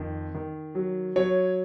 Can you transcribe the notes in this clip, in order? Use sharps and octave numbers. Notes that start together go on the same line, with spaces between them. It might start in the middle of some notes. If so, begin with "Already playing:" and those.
Already playing: F2 D#3
D#3
F#3
F#3 C#5